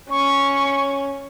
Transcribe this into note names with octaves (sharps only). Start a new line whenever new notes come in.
C#4 C#6